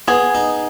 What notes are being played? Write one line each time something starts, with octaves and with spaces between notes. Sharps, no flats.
B3 G#4
D#4